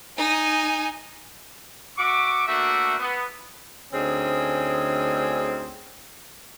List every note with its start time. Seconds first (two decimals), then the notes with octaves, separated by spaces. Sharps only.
0.17 D#4 G#5
1.98 F#4 E5 C#6 D6
2.47 A3 A#3 D4 F#4 E5
2.99 B3
3.93 D2 D3 C4 C#4 D#4 G#4